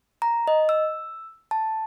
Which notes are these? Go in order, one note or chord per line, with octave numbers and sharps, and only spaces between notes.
A#5
D#5
E6
A5